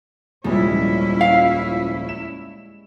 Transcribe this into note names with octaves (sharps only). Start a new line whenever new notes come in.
D#1 C2 F2 G3 G#3 C#4 E4
F5
E7